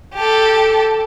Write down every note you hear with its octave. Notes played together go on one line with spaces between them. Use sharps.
G4 A4